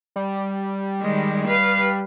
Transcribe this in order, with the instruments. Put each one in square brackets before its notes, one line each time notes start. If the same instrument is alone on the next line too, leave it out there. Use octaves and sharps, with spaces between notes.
[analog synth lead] G3
[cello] D#3 G#3
B4 F5